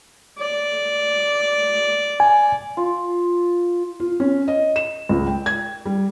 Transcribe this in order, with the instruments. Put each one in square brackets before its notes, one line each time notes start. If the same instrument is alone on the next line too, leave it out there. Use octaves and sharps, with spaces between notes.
[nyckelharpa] D5
[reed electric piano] G#5
[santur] F4
[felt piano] F4
C#4
D#5
E7
C#2
G5
G#6
G3